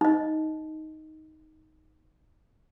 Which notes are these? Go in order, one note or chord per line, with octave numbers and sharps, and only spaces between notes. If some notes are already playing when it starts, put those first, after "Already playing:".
D#4 D#5